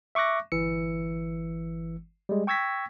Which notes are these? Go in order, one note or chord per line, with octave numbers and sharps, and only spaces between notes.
E5 C#6 D6 F#6 A#6
G1 E3 E6 C#7
G3 G#3
G5 C#6 E6 G#6 A#6 B6